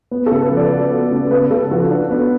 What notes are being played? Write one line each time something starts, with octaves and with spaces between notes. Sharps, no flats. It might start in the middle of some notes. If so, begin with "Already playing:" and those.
B3
A4
C#3
B4
F3
D5
F#4
B3
C#3
B3 B4
C#3 A4
F3 F#4
D4
B3